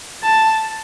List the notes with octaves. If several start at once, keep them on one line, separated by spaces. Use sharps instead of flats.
A5